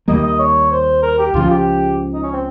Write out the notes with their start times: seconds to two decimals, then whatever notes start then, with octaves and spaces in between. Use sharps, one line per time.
0.08 D#2 D#3 G3 A#3 D#5
0.24 D#5
0.39 C#5
0.72 C5
1.02 A#4
1.19 G4
1.34 C#2 C#3 F3 F4
1.51 G4
2.13 D#4
2.23 C#4
2.33 C4